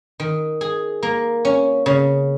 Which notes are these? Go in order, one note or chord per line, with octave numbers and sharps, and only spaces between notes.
D#3
G#4
A#3
C#4
C#3